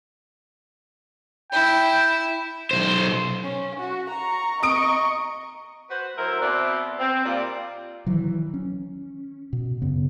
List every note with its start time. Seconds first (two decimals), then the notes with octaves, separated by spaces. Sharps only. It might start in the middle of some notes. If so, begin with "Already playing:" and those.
1.52 E4 G5
2.71 B1 C5
3.44 C#4
3.79 F#4
4.09 A#5 C#6
4.63 D#5 A#5 C#6 D#6 D7
5.90 F#4 B4 C5
6.17 F#3 A3 E4 A#4 C5
6.41 B2 C4 B4 D5 E5
6.99 C4
7.25 A#2 G3 F4 D5
8.06 D#3 E3 F#3
8.54 C#4
9.53 B2
9.82 F#2 C#3 B3